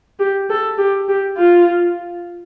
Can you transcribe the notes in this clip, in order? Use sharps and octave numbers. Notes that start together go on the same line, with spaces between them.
G4
A4
G4
G4
F4